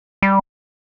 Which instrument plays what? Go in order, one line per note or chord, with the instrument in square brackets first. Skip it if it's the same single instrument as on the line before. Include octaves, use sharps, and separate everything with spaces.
[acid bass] G3